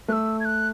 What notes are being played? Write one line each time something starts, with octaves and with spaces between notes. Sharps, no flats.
A3 E6 F#6
G#6
F#6